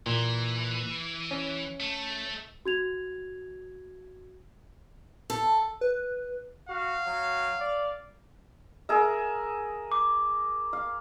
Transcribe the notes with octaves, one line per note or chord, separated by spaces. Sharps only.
A#2 E3
C#4
A3
F#4 G#6 F7
A4
B4
F#4 F5
F#3
D5
G#4 A#4 E5
D6
F5